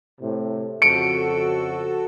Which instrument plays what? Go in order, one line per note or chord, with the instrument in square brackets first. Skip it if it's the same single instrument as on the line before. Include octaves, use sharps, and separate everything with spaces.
[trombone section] A2 C3
[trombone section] F2 C#3 [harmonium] F#4 A4 [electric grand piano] C#7 D7